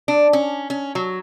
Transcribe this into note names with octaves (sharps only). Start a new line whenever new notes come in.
D4
C#4
C#4
F#3